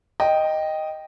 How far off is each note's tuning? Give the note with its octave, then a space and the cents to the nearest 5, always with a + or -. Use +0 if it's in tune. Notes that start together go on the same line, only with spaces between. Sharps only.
D#5 +0 G5 +0